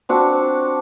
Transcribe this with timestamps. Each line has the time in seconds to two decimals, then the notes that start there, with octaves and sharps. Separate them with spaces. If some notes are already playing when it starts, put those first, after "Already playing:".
0.09 C4 D4 F#4